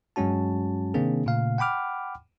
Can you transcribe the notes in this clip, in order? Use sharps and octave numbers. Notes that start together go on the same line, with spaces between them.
G2 F#3 G#3 C#4 F#4 A5
C3 D#3 A#3 C4 D4 G#4
A#2 C#3 A3 F5
F#5 G5 B5 D6 F6